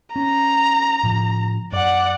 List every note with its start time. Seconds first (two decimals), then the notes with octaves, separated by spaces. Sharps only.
0.16 C#4 A#5
1.03 A2 C#3 F3
1.73 F#2 D5 F#5